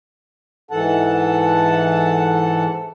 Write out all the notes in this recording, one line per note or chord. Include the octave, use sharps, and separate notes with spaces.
G#2 E3 A4 F#5 A5